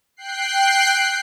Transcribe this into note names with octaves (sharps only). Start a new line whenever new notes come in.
G5 F#6 C7